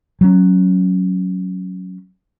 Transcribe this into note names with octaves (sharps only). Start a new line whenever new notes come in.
F#3 C#4